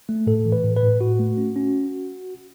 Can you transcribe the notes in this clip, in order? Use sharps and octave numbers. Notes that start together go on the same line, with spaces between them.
A3
A2 A4
E3
B4
A2
B4
A2
A2 F#4
A3
C#4
C#4